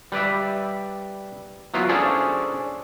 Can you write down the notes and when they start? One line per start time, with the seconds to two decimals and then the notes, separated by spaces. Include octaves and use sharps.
0.12 G3 B4 D5 E5
1.74 F#3 B3 E4 F4
1.89 C#4 D4 G#4 A4 C5 D5